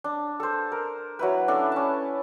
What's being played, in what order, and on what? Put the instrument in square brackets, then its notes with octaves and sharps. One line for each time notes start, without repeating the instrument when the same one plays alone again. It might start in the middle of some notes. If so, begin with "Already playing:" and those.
[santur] D4
A4 C5
A#4
F#3 E4 B4
C#4 D4 E4 A4
C#4 A5